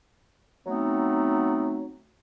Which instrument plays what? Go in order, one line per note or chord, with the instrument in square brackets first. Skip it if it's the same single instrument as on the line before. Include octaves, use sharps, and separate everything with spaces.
[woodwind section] F#3 A3 B3 C4 D#4